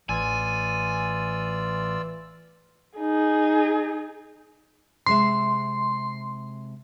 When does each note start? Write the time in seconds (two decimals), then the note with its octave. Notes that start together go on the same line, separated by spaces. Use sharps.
0.09 A1 E3 F4 D5 G#5 E6
2.99 D#4 G#4
5.06 C3 G#3 E5 C6